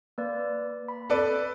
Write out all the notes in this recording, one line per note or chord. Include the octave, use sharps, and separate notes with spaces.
A#3 B4 D5
B5
A4 B4 D5